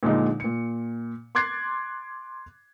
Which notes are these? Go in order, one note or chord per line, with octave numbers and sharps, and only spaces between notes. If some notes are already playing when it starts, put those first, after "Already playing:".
A#2 D3 F3 G#3 D4 D#4
A#2 C#7
C6 D6 F#6 G#6 A6 C7